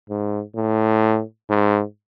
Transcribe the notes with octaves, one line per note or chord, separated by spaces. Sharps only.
G#2
A2
G#2